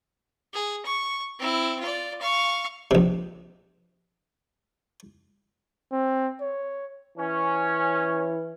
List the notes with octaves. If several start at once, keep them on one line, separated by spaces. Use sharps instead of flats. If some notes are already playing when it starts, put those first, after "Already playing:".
G#4
C#6
C4 E4
F4 D5
F5 C#6
A#1 C3
C4
C#5
E3 C#4